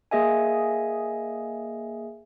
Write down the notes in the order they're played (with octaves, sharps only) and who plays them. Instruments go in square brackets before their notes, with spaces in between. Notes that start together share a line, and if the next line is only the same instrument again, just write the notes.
[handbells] A#3 G#4 D#5 E5 G#5